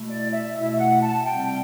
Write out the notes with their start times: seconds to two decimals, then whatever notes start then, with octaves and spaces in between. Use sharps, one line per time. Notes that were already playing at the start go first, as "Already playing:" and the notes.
Already playing: B2 A3 E4
0.09 D5
0.33 E5
0.56 B2 A3 E4 E5
0.79 F#5
1.02 A5
1.26 C3 G3 C4 G5